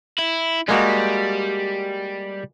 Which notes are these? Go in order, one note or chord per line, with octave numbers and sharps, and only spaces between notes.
E4
G3 G#3 A#3 F#4